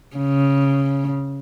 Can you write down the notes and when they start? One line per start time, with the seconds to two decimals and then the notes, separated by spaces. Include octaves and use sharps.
0.17 C#3